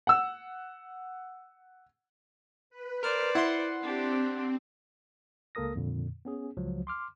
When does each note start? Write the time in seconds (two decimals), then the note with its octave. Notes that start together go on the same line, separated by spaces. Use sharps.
0.07 F#5 E6
2.70 B4
3.03 A#4 C5 D5 F6
3.35 E4 F#5 C6
3.82 C4 D4 G4
5.55 C#2 A#3 A4 A#4 D#6 A#6
5.76 F2 A#2 D3
6.25 B3 C#4 G#4
6.57 C#2 F3 F#3
6.87 C6 D6 F6